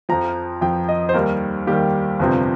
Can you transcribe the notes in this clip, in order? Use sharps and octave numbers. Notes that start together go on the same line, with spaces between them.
F2 F3 A#5
F2 F3 G5
D#5
C5
D#2 D#3 G3 A#4
D#2 D#3 G3 G4
G1 F2 C3 F3